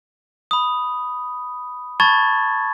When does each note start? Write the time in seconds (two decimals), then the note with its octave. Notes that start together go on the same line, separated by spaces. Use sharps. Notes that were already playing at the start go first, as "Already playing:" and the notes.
0.51 B5 D#6
2.00 A5 B5 C#6 G#6 A6